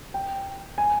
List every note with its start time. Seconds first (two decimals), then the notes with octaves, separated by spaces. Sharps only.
0.14 G5
0.78 G#5